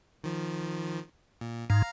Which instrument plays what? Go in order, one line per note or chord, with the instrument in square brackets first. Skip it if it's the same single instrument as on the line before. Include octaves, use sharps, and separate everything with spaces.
[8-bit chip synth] D#3 F3
A#2
[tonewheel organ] G#2 [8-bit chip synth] F5 A#5